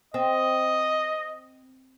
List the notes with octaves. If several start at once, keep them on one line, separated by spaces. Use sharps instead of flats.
C4 D#5